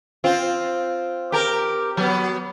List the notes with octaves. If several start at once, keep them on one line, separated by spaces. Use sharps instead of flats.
C4 F4
G4 A#4
F#3 B3